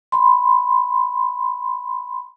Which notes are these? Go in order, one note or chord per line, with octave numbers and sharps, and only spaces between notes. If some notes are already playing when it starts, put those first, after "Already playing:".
B5 C6